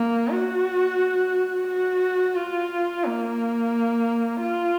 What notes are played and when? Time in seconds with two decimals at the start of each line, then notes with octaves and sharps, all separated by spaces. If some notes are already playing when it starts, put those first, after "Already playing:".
Already playing: A#3
0.30 F#4
1.67 F#4
2.36 F4
3.05 A#3
4.42 F4